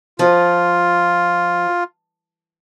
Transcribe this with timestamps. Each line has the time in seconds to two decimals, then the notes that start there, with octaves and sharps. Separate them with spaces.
0.19 F3 F4